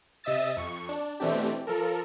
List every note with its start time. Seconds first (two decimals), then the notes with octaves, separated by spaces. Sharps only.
0.24 C3 D#5 E5 D#6 E6 A6
0.57 F2 C#6
0.89 D4
1.20 B2 E3 A3 C4 D4 G4
1.67 F3 A4 A#4